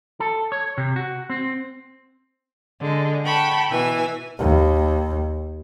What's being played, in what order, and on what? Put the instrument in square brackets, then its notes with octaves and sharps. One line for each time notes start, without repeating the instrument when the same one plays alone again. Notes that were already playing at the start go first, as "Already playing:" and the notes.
[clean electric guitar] A4
C#5
C3
F#4
C4
[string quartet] D3 G#3
F#5 G5 A5 B5 C#6
B2 E3 G#5 E6
[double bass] D#2